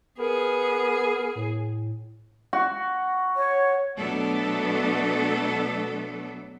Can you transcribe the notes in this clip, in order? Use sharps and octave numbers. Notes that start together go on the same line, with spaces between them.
B3 G#4 A#4
A2
F#4
C#5
B2 F#3 A3 B3 D4 A4